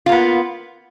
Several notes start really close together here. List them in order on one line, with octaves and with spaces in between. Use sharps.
F4 A#3 B3